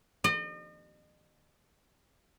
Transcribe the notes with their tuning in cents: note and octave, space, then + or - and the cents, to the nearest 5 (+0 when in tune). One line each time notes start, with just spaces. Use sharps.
D#5 -40